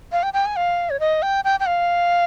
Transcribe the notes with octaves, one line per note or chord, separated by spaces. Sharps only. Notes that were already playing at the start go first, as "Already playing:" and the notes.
F5
G5
G5
G#5
F5
C#5
D#5
G5
G5
G5
F5